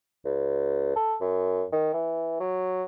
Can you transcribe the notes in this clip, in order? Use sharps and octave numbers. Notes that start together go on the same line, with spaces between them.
C#2
A4
F#2
D#3
E3
F#3